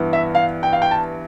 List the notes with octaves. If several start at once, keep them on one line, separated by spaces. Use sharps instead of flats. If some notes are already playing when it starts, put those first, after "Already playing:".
Already playing: G2 E3 B3
E5
F5
G5
F5
G5
A5